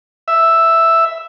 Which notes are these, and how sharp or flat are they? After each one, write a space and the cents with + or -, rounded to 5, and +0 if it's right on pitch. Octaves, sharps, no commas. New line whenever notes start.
E5 +0